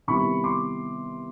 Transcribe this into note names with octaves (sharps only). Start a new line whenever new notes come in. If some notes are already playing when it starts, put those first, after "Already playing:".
C3 D#3 G3 B3 E4 B5 C#6
C6 D6